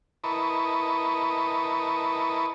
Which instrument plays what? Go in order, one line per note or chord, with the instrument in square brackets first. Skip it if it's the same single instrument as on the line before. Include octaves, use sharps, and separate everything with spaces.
[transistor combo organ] E4 A#4 B4 D#5 A5 C#6